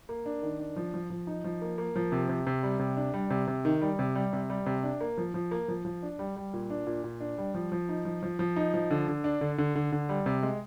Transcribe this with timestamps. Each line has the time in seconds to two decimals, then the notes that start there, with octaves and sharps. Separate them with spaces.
0.09 A#3
0.26 D4
0.42 D#3
0.60 D4
0.76 F3
0.94 F3
1.10 F3
1.27 D#4
1.44 F3
1.61 A#3
1.78 A#3
1.96 F3
2.12 C3
2.29 C3
2.47 C3
2.63 G3
2.79 C3
2.97 D4
3.14 G3
3.30 C3
3.48 C3
3.65 D#3
3.82 G3
3.99 C3
4.15 G3
4.33 C3
4.50 G3
4.66 C3
4.83 D4
5.01 A#3
5.18 F3
5.34 F3
5.51 A#3
5.68 F3
5.85 F3
6.03 D4
6.19 G3
6.36 G3
6.53 A#2
6.70 D4
6.87 A#2
7.04 A#2
7.20 D4
7.38 G3
7.54 F3
7.72 F3
7.89 D#4
8.05 F3
8.23 F3
8.39 F3
8.56 D#4
8.74 F3
8.91 D3
9.08 D3
9.24 D4
9.41 D3
9.58 D3
9.75 D3
9.92 D3
10.09 G3
10.26 C3
10.43 G#3